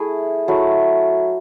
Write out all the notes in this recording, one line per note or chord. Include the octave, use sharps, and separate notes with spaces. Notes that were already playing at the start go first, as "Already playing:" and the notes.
Already playing: A3 E4 G#4
F#3 A3 E4